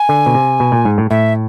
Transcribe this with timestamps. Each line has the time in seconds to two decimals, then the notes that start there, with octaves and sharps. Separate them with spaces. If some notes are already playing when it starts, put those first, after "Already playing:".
Already playing: G#5
0.09 D3
0.26 B2
0.34 C3
0.60 B2
0.72 A#2
0.85 G#2
0.98 A2
1.10 A2 E5